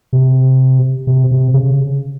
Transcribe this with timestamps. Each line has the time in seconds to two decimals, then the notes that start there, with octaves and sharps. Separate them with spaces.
0.13 C3
1.07 C3
1.31 C3
1.54 C#3